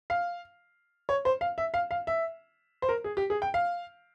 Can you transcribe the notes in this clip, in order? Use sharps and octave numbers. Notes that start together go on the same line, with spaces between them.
F5
C#5
C5
F5
E5
F5
F5
E5
C5
A#4
G#4
G4
G#4
G5
F5